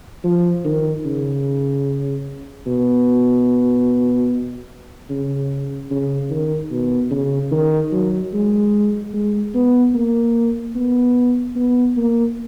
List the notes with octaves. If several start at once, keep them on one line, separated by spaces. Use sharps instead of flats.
F3
D#3
C#3
B2
C#3
C#3
D#3
B2
C#3
D#3
F#3
G#3
G#3
B3
A#3
B3
B3
A#3